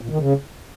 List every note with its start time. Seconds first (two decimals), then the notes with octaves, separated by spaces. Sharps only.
0.01 A#2
0.10 D#3
0.19 C#3